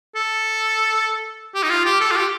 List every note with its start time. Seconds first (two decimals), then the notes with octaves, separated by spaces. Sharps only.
0.16 A4
1.55 G4
1.63 D#4
1.70 F4
1.85 G4
2.01 A4
2.11 F4
2.16 G4